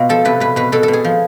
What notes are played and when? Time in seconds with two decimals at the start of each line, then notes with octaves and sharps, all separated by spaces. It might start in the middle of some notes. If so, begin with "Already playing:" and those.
Already playing: B2 F4
0.09 F3 A4
0.25 C3 B4
0.40 B2 B4
0.56 B2 B4
0.72 B2 A4
0.83 A4
0.88 B2
0.93 G#4
1.04 F3